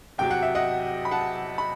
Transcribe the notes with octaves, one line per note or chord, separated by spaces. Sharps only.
E2 C3 F#3 G5
F#5
E5
D#5 F#5
B5
F#5 A5
B5